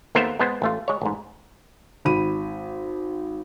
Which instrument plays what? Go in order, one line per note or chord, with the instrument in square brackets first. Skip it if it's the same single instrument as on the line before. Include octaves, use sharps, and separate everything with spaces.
[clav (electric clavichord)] D#2 A3 B3 A#4 C5 E5
G#3 B3 C5
A1 A3 F4
G#3 C#5
A1 G#2
[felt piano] G#1 B5 D#7